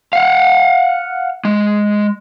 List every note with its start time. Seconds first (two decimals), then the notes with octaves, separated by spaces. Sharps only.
0.13 F5 F#5
1.45 G#3